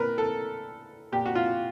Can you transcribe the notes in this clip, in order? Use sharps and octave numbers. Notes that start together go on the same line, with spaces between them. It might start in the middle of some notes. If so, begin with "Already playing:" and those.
Already playing: A#2 A#4 B4
A4
A#2 G4
F#4
F4